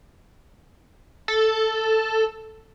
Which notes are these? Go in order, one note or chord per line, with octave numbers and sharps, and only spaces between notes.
A4